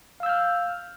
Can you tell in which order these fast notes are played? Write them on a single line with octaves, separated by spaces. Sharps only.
F5 E6 G6 F6